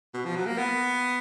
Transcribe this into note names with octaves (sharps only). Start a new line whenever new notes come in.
B2
F3
F#3
A#3
B3